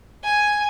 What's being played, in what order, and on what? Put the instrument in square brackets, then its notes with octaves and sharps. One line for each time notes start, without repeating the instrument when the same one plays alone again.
[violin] G#5